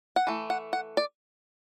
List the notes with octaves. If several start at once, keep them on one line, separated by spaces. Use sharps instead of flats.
F#5
E3 A3
F#5
F#5
D5